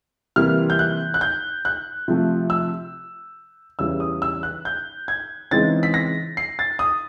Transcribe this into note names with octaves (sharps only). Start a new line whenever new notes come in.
C3 E3 G3 A#3 F6
G6
F#6
F#6
G6
F#6
C3 F3 A3
E6
E2 C#3 E3 G3 E6
D#6
E6
F#6
G6
G#6
C#3 E3 G#3 C4 D#4 A6
B6
A#6
C7
A6
D#6